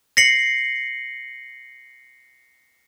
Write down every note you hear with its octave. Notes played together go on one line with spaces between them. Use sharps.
A#6 C7 C#7 F#7